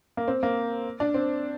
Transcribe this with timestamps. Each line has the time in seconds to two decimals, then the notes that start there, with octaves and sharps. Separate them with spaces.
0.17 A#3
0.28 C4
0.43 A#3
1.00 D4
1.14 C4